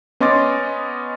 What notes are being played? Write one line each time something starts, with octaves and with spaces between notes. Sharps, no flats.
B3 C#4 D#5 C6 D6 A6